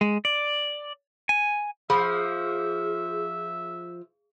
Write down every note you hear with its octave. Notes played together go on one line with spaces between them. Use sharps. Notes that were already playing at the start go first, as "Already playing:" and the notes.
G#3
D5
G#5
F3 G#4 E5 B5